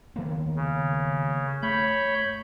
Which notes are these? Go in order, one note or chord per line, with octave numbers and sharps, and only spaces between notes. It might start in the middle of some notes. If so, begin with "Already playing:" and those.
D#3 A#3 B3
C#3
G2 A3 C#5 B5 G6